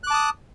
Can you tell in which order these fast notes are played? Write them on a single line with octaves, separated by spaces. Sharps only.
F#6 D6 A5 D#6